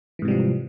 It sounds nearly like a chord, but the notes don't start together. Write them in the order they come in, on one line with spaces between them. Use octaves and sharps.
E3 G#2 C3 G3 F3